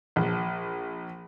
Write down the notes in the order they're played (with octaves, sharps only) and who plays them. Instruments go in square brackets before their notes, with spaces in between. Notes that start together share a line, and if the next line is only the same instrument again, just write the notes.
[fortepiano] A#1